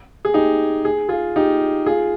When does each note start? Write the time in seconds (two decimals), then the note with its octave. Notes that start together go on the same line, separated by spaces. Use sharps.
0.25 G#4
0.34 D#4 G4
0.85 G#4
1.09 F4 G#4
1.36 D#4 G4
1.86 F4 G#4